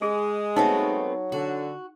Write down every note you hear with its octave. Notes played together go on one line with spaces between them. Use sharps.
G#3 G#4
F#3 A3 B3 C4 D#4
D3 F#4